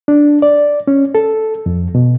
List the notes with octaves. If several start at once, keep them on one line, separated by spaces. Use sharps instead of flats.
D4
D5
C#4
A4
F2
B2